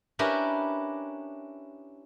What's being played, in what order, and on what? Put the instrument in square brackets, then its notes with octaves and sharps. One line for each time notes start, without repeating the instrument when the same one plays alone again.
[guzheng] C#4 D4 E4 G4 A#4 B4